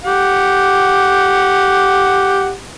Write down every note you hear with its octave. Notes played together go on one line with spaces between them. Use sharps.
G4 F#5